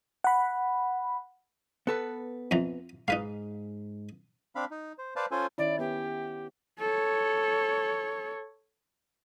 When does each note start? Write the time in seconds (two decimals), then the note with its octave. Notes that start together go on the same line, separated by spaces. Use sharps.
0.24 F#5 B5
1.87 B3 A4 B4
2.51 F2 E3 A#5
3.08 G#2 D#4 B4 F5
4.56 C4 D4 F5 B5
4.71 D#4
4.98 C5
5.16 B4 C5 D5 F5 A5
5.31 C#4 F4 A4 C5 G#5
5.58 D#3 C#4 E4 D5
5.79 B3 G4
6.80 A4 C#5